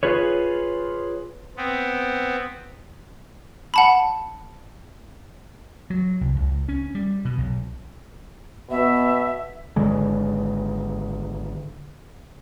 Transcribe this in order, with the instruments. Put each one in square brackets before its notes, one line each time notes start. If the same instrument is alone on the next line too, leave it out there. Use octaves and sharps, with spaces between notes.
[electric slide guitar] F4 G#4 B4 C#5
[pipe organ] B3 C4
[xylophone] F#5 A5 B5
[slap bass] F#3
C2
C#2
C#4
G3
B2
B1
[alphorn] B2 [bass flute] B3 [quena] E5
[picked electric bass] G#1 D3 G#3